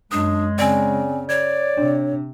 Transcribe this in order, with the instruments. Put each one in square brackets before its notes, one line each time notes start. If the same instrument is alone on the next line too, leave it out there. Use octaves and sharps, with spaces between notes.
[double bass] F#2 [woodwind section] G#3 [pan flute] D4 [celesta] D#6
[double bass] C#3 [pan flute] C4 [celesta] D5 G#5
[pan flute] C#5 [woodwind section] D5 [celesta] G#6
[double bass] C3 [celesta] D4